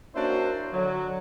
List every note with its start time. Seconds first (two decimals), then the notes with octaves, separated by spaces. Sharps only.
0.15 A#3 C#4 D4 E4 F#4 C5
0.73 D3 F#3